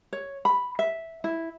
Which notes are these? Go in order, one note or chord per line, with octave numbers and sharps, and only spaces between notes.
C#5
B5
E5
E4